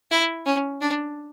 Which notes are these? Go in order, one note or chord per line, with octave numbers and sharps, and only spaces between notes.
E4
C#4
D4